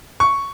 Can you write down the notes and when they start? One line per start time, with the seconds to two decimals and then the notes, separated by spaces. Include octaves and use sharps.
0.20 C#6